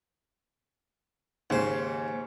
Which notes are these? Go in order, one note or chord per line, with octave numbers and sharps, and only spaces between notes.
D#2 G#2 C#3 C5